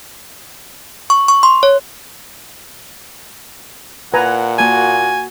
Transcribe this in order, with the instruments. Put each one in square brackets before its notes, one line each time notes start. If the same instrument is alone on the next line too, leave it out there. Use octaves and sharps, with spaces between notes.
[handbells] C#6
C#6
C6
C#5
[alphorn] A#2 [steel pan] B4 G#5 A#5 [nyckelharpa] F#5
[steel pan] A#3 A5 [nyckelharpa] F#4 [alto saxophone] G#5